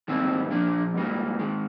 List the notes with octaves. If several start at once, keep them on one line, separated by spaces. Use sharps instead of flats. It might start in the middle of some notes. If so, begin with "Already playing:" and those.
G#2 D#3 G3 A#3 C4
A#2 F3 A#3 D4
G#2 G3 A#3
G#2 D#3 G#3